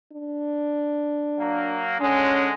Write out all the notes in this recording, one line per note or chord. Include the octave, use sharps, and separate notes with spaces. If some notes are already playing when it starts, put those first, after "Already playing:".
D4
F#3 A#3
D3 G#3 C#4